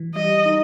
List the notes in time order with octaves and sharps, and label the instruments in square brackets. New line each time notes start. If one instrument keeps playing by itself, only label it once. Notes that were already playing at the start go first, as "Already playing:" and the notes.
Already playing: [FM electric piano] E3
[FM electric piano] G3 [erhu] D#5
[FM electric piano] D#4